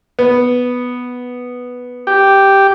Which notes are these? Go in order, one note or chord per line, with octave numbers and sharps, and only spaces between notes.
B3
G4